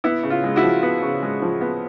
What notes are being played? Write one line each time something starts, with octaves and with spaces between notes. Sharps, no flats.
B3 E4
C#3
F4
G#3
E4 F#4
F3
B3
C#3
G#3
F3
B3